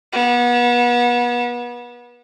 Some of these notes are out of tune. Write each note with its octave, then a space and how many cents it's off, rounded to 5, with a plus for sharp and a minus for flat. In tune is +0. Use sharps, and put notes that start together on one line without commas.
B3 -35